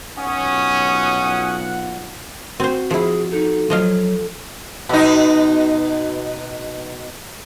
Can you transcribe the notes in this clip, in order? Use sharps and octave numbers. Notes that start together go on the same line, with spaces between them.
B1 C#4 F4 F#5 D#6
C4 F#4 C5
F3 E4 G#4
D#4 A4
F3 F#3 D#5 F5
B2 D#4